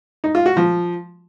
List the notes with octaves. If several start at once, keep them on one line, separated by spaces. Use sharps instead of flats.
D#4
F4
F#4
F3